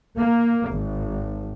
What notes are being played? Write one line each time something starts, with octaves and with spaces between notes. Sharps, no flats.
A#3
G#1